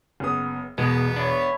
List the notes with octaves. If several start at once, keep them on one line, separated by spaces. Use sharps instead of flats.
F#1 B3 D#6
E1 B2 G#3 B3
D4 C#5 E5 B5